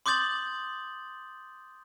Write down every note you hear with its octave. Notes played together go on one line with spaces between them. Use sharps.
C6 D6 D#6 G6 A6 F#7